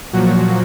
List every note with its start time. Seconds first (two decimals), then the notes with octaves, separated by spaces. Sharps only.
0.13 A#2 F3 F#3 F#4